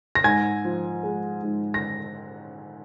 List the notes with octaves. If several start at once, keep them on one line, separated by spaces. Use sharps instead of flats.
A#6
G#2 G#5 G#6
F3
G#3
G#2
A#6